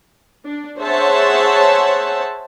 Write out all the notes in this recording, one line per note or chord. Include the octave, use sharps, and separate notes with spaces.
D4
G#4 C5 C#5 E5 F#5 A5